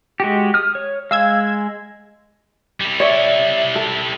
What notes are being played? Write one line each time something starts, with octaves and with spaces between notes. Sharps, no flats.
G#3 F#4 G4
D#6 F6
C#5
G#3 F5 E6 G#6
G3 E4
C#5 D5 E5
A4